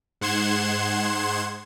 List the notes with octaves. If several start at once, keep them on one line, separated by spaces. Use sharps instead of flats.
G#2 F#5 C6 G#6 E7